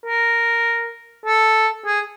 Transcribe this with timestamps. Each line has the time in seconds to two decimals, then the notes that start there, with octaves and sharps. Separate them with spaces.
0.06 A#4
1.26 A4
1.86 G#4